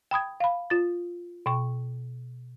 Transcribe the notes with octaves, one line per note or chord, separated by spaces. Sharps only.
G5 B5 D#6 G#6
F5 B5
F4 A6
B2 G5 C#6